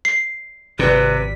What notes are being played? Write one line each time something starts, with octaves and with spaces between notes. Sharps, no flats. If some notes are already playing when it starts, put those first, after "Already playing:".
C7
G#1 C3 G3 B4 B6